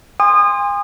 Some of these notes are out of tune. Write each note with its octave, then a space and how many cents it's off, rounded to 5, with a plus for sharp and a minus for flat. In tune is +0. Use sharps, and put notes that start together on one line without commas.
G#5 -40 C6 +0 D#6 -25